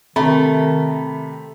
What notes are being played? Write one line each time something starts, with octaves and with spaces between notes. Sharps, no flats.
C3 D#3 A3 A#5 B5